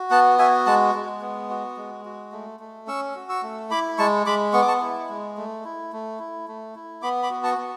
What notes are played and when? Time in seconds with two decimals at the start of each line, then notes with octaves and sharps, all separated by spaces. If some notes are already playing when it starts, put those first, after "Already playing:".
Already playing: F#4
0.10 B3 F#5 A5
0.39 F#4 E5 G#5
0.66 G#3 F#5 A5
0.95 G#3
1.21 B3
1.50 F#4
1.77 G#3
2.05 F#4
2.32 A3
2.60 A3
2.87 C#4 C#6 E6
3.16 F#4
3.29 C#6 E6
3.43 A3
3.71 E4 B5 D6
3.98 G#3 A5 C#6
4.26 G#3 B5 D6
4.53 B3 C#6
4.62 D6
4.68 A5 C#6
4.82 E4
5.09 G#3
5.37 A3
5.65 E4
5.92 A3
6.19 E4
6.48 A3
6.75 E4
7.02 B3 B5 D6
7.23 B5 D6
7.30 F#4
7.44 A5 C#6
7.58 B3